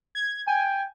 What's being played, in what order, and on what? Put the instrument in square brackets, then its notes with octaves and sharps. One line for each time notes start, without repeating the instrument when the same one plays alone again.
[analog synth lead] G#6
[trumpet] G5 [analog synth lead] G#5